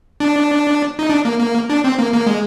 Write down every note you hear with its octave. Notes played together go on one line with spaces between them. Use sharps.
D4
D#4
D4
A#3
A#3
D4
C4
A#3
A#3
G#3